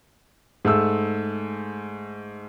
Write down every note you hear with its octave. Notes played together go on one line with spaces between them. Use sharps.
G#2 A3 E6